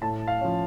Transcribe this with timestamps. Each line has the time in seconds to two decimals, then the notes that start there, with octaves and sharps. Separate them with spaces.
0.01 A2 A5
0.28 F5
0.41 F3 C#4